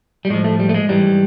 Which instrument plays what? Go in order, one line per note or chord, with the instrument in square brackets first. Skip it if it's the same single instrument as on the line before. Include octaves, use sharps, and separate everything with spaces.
[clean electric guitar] G3
A2 F3 G#3
A3
G3
A3
G#3
G#2 E3 G3